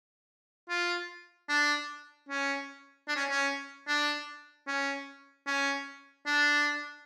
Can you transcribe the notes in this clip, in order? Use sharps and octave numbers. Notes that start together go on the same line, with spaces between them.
F4
D4
C#4
D4
C#4
C#4
D4
C#4
C#4
D4